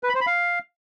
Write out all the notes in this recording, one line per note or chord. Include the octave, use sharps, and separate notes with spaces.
B4
B5
C5
B5
F5